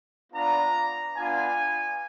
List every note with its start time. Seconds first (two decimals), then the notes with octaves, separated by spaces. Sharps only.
0.33 B3 D4 F4 A#5
1.16 B3 D4 F4 G#5